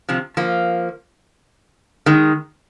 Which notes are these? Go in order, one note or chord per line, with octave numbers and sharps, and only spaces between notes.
C3 F3
F3 A#3
D#3 G#3